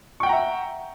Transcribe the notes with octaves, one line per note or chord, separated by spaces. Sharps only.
E5 F#5 G5 A#5 C#6